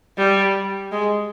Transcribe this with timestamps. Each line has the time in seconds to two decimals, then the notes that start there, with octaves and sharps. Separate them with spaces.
0.18 G3
0.92 G#3